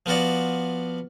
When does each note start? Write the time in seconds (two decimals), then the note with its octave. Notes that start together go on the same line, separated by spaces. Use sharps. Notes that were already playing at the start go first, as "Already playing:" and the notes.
0.06 F3 B3 F4 F#4 D5